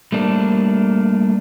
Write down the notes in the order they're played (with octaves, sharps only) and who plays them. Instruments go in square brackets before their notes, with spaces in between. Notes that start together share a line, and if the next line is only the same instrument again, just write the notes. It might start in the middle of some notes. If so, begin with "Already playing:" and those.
[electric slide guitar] G3 A3 A#3 D4